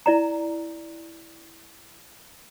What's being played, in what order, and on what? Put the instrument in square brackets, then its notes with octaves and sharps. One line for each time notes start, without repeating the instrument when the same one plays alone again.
[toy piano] E4 D5 A#5